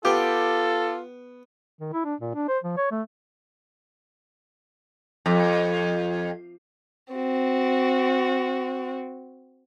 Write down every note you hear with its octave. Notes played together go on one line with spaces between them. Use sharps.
B3 F4 G4 A4
D#3
E4
D4
A#2
D4
C5
F3
C#5
A3
F2
C4 F#4